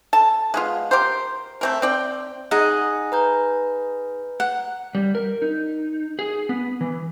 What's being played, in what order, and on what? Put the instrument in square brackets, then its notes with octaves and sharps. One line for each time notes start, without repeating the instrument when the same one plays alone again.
[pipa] A4 A5
G#3 B3 F4
G4 A#4 C5
A3 C4 A#4
C4 D5 G5
[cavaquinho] D#4 G#4 F#5
[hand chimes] B4 A#5 G6
[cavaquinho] F#5
[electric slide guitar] G3
A#4
D#4
G#4
B3
E3